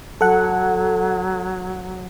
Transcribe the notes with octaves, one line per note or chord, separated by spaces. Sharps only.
F#3 A4 F#5